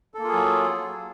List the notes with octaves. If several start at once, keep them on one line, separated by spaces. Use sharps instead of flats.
F#3 A#3 F4 G#4 A4